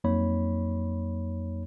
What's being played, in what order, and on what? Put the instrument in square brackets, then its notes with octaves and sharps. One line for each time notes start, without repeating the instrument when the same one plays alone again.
[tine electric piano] F2 F#3 A#3 D#4 C#5 B5